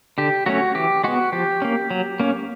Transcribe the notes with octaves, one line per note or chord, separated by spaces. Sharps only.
D3 G4
F#3 A3 C#4 F#4
E3 G4
G#3 B3 F#4
F3 G4
A#3 C#4
F#3
A#3 C#4